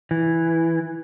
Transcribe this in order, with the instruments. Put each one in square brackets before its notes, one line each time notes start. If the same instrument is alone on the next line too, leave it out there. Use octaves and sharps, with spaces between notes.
[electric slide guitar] E3